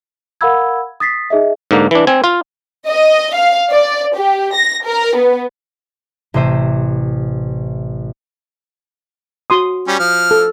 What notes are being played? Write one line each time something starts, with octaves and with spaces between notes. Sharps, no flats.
A#4 F5 F#5 B5 E6 G#6
D#6 A6 B6 C7
D#4 G#4 D#5 E5
G#2 D3 A#3
E3 D4
C4 G#5
F4
D#5
F5
D5
G4
A#6
A#4
B3
A1 C3 C5 E5 D#7
F#4 C6 D#6
G3 C#4
F3 F6
A4